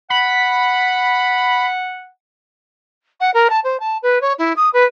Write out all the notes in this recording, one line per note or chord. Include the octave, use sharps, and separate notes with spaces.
F#5 B5
F#5
A#4
A5
C5
A5
B4
C#5
E4
D#6
B4